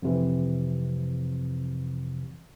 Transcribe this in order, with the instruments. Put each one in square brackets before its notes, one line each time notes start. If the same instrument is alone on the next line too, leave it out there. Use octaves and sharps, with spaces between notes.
[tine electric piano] F2 C3 E3